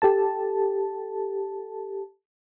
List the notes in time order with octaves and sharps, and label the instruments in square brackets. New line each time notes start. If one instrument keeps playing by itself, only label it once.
[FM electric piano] G4 A4 A5